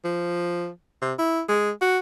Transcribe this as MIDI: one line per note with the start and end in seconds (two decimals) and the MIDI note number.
0.04 0.69 53
1.02 1.13 48
1.19 1.42 64
1.48 1.70 56
1.81 1.98 66